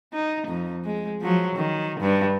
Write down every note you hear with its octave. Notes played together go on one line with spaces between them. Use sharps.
D#4
F2
G#3
F3 F#3
D#3
G2